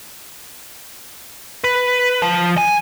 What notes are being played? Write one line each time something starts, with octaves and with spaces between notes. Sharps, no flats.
B4
F3
G#5